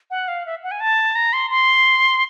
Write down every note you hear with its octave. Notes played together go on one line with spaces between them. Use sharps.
F#5
F5
E5
F#5
G#5
A5
A#5
C6
C6